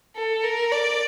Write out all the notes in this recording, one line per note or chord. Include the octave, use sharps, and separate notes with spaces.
A4
A#4
D5